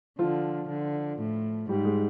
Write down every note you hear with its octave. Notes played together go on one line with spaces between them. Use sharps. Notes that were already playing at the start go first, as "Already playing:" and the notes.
D3 F3 F4
D3
A2
G#2 G3 G4
G#3 G#4